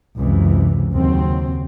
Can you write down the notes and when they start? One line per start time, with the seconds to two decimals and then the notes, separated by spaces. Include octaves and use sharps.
0.17 C#2 F#2 C3 E3
0.93 D#2 C#3 F#3 C4